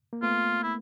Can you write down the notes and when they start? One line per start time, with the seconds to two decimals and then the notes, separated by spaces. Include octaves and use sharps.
0.13 A#3
0.23 A3 B3 F4
0.63 E4